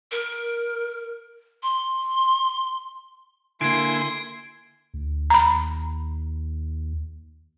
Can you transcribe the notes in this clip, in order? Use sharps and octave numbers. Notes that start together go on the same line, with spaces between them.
A#4
C6
D3 A#3 E4 G#5 C6 G#6 C7 D7
D2
D#2 A#5 B5